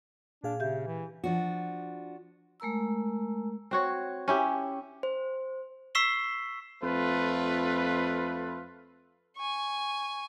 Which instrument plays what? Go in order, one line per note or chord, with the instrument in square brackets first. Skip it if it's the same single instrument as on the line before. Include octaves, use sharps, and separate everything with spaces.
[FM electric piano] A#2 G#4 F5 [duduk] D4
[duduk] C#3 [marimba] G4 E5 G6
[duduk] E3
[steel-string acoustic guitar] F3 D4 F#4
[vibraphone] G#3 A3 A#4 A#5 E6
[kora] C4 F#4 C#5
C#4 E4 G4
[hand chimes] C5
[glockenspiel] C#6 E6 B6 C7 E7 G7
[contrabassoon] F2 [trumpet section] A3 F4 B4
[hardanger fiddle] G#5 C#6